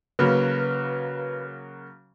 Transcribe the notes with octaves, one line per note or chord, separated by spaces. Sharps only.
C#3 F#3 A#3 B4